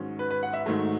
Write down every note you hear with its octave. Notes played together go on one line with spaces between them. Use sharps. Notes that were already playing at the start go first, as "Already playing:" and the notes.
Already playing: G#2 D#3 F#3 C#4
B4
B4
F#5
E5
G#2 D#3 F#3 A3